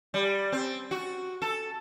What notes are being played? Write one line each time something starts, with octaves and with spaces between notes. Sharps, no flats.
G3
C4
F#4
A4